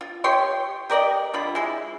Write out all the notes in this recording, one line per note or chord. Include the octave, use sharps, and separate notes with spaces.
F4
G4 C#5 G5 C6
G4 A#4 D5 D#5
D3 F4 B5
G#3 E4